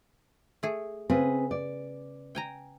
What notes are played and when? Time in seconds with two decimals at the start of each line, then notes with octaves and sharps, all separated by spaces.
0.63 A3 G#4
1.10 C#3 C4 G#4 B4
1.51 D5
2.35 G5 G#5 A#5